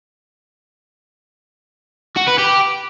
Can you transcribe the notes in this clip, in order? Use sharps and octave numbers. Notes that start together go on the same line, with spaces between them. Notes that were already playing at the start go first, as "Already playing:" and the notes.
F#4
B4
G4